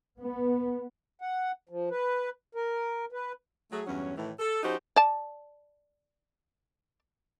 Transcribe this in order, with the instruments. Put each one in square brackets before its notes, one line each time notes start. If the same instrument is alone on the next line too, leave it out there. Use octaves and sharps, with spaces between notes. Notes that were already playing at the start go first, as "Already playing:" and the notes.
[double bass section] B3
[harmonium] F#5
F3
B4
A#4
B4
[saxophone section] F#3 A3 G#4
E2 G2 F#3 C#4
A2 D#3 E3 A3
A4
F3 C#4 D#4 F#4 G4 C5
[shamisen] D5 A5